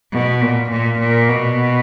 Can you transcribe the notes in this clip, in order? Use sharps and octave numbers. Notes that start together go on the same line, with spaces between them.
B2
A#2
A#2
A#2
B2